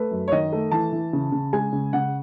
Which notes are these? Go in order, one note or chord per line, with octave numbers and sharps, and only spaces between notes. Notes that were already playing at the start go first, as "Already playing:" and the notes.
Already playing: A3 B4
F#2
C#5
D#3 D#5
A3
E3 A5
E3
C#3
C#3
G#3 G#5
C#3
C#3 F#5